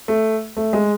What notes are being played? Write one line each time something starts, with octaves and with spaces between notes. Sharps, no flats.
A3
A3
G#3